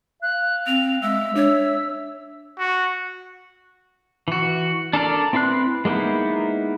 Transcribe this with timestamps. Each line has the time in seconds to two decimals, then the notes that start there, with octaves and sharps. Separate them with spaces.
0.22 F5 F#6
0.67 C4 F7
1.02 G#3 E5 E6
1.36 D4 C#5
2.58 F#4
4.28 E3 F#4
4.93 D4 A4 A#4 D5
5.33 C4 E4 B4 C6 F#6
5.85 G#3 A#3 B3 D#4 E4